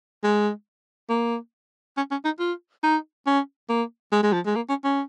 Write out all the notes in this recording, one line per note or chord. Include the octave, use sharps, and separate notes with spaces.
G#3
A#3
C#4
C#4
D#4
F4
D#4
C#4
A#3
G#3
G#3
F3
G#3
A#3
C#4
C#4